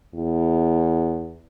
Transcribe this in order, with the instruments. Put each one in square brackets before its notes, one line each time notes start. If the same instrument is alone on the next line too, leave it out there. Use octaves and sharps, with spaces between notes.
[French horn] E2